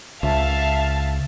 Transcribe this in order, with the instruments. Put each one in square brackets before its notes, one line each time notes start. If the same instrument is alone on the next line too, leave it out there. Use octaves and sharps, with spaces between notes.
[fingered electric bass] C#2 [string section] E5 F5 A5